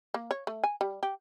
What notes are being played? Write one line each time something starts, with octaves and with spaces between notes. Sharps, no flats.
A#3
C#5
A3
G#5
G3
G4